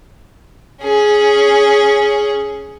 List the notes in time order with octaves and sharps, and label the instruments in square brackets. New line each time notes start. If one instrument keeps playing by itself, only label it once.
[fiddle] C#4 G#4